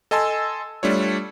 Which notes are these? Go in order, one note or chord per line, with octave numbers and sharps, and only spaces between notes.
A4 D#5 G#5 A5 C6 E6
G3 A3 D4 F4 C#5